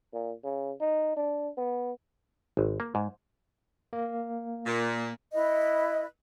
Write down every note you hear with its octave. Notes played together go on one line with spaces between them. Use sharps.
A#2
C#3
D#4
D4
B3
G#1
A#3
G#2
A#3
A#2
E4 B4 D#5